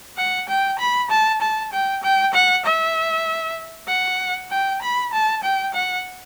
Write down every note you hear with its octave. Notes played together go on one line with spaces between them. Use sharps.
F#5
G5
B5
A5
A5
G5
G5
F#5
E5
F#5
G5
B5
A5
G5
F#5